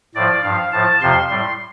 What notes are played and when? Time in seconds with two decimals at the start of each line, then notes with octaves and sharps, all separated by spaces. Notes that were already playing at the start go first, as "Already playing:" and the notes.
0.15 A2 F3 D5
0.43 G2 F3 F5
0.72 A2 F3 A5
1.01 F2 C3 F3 C6
1.31 A2 G3